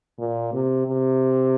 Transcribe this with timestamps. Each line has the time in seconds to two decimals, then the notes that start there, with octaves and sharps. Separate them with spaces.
0.19 A#2
0.53 C3
0.88 C3